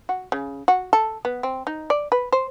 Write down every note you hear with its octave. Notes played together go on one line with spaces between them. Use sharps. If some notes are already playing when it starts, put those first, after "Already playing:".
F#4
C#3
F#4
A4
B3
C4
D#4
D5
B4
C5